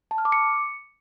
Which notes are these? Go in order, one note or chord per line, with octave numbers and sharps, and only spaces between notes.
A5
F6
D6
C#7